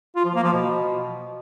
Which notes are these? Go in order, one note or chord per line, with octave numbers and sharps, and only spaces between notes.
F4
F3
A#3
F3
B2